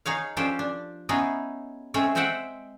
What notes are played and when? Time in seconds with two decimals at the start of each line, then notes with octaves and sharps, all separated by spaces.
0.06 D#4 G#4 C#5 F5
0.37 F3 C#4 D4 G4 A4 C5
0.59 D4
1.09 B3 C#4 D#4 E4 G#4
1.94 G#3 A3 C4 C#4 G#4 A4
2.15 G#3 C4 C5 E5 F#5 G5